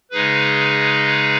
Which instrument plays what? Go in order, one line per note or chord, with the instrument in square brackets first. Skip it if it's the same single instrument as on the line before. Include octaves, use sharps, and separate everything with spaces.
[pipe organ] C#3 G#3 D#4 G#4 B4